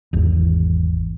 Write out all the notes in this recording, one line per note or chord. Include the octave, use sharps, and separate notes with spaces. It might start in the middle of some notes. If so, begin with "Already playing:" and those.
G#1 E2